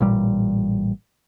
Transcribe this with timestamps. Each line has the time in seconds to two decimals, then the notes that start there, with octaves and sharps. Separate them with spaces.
0.01 A1 A#2 G3